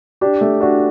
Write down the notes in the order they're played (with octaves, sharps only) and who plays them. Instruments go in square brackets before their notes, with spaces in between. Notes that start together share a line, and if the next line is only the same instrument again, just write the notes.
[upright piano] D4 [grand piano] G4
[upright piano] A3
[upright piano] D4 [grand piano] F#4